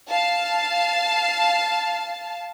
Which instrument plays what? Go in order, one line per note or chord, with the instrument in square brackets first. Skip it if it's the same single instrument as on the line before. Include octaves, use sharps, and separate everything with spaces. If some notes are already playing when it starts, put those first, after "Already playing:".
[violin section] F5 A5